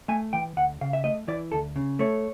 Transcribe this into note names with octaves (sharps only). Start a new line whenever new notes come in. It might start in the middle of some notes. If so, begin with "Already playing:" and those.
A3 G#5
E3 G5
D2 F#5
C#3 F5
E5
A3 D#5
E3 D5
D2 A4
C#3
A3 C#5